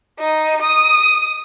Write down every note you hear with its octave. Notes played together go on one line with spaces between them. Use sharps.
D#4
D#6